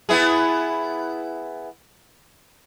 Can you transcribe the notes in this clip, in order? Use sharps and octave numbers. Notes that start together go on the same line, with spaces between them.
B3 E4 G#4